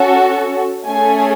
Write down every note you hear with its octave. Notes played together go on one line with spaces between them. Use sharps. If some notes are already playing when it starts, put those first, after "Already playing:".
Already playing: C#4 F#4 A4
A3 C#4 G#4 G#5